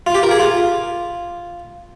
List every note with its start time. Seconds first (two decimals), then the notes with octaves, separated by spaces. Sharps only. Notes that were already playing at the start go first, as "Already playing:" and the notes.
0.07 F4
0.15 G4
0.23 A#4
0.31 G#4
0.40 F4